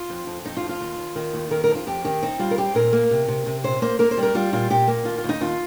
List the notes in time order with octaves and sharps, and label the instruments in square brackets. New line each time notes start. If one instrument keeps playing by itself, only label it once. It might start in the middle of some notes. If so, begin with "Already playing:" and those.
Already playing: [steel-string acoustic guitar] F4
F2
F2
F2 D#4
F4
F2
F4
D#2
D#2
D#3
D#2
D#3 A#4
A#4
F2
F4
F2 G4
D#3 G4
C4 D#4
G3 F4
A#4
C4 G4
A#2 A#4
A#3
C3
C3
C3
A#2 C5
A#3 C5
A#3 A#4
C5
G3
A#4
G3 F4
A#2 F4
A#2 G4
A#3
D#2 F4
F4
D#2 D#4
D#2 F4